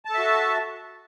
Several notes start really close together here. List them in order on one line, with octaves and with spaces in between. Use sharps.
A5 A4 E5 F#4